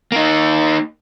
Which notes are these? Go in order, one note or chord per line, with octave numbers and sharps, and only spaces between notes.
A#3 D#4